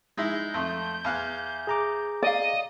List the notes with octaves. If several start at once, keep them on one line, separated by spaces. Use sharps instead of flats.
G#3 D#4 E4 G6
F2 A3
E2 F5 F#6
G#4 A#5 D6
D5 D#5 F5